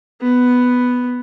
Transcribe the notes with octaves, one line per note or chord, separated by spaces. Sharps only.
B3